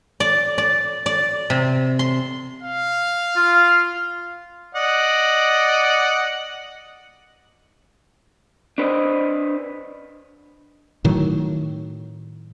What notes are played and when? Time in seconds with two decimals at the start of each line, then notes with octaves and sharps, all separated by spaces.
0.20 D5
0.58 D5
1.06 D5
1.50 C3
1.99 C6
2.63 F5
3.36 F4
4.75 D5 D#5 F#5
8.78 D4 B4 C5 D#5
11.04 A2 D#3 F#3